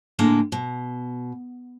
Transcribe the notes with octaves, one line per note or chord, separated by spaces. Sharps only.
A2 D3 G#3 A#3
B2